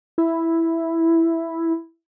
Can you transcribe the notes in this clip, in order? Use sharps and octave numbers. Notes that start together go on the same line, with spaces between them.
E4